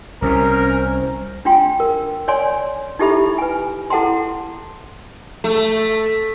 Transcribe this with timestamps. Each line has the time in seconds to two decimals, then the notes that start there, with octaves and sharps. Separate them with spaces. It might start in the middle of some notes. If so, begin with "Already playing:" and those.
0.22 C2 C3 C#4 A#4 C5
1.45 D4 F4 G5 C6
1.80 A#4
2.28 C#5 D5 G#5 C6
2.99 D#4 E4 G4 A4 E5 B5
3.38 B4 G#5
3.90 E4 A4 F#5 A5 C6
5.44 A3